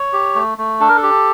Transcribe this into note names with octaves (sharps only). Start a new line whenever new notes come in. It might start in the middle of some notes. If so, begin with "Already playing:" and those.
Already playing: C#5
G4
A3
A3
D4 A4
A#4
A4
G4